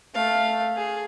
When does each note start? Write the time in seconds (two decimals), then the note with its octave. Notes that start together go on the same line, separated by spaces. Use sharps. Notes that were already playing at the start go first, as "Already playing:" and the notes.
0.14 A3 F5
0.76 G#4